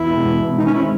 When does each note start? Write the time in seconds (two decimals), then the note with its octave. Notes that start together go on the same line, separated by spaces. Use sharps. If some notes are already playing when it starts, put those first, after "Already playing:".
Already playing: E2 E4
0.09 B2 G#3
0.25 E2
0.42 B2 G#3
0.58 D#3 D#4
0.66 C#4
0.74 G#3 C4 E4